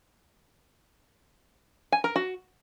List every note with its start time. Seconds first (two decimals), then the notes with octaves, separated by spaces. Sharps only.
1.92 G#5
2.04 A#4
2.16 F#4